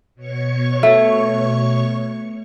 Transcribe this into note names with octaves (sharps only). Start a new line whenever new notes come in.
B2 C#5 C#6
A3